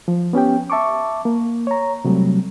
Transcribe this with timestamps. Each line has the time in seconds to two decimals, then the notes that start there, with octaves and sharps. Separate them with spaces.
0.08 F3
0.33 B3 C#4 G4 G5
0.70 E5 A5 C#6 D6
1.25 A#3
1.67 C#5 A#5
2.05 C3 F#3 G3 A3